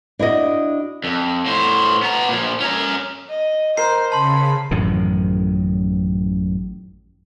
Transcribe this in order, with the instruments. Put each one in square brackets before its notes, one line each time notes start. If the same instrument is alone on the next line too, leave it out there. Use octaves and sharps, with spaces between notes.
[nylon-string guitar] D4 E4 F#4 D#5
[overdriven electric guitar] F2
A2 C5
B3 A#5
A#2 F3
C#4 A#5
[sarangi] D#5
[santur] A#4 [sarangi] C5 [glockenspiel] C7
[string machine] C#3 [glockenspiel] A5 C6 [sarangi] B5
[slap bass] A1 F#2 A2 D#3